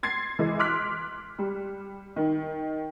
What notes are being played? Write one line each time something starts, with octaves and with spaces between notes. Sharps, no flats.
C6 G#6 A6 C7
E3 G#3
C6 D6 F6 F#6 B6
G3
D#3